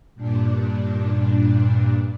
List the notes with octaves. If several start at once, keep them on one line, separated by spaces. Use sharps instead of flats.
G2 A#2 D4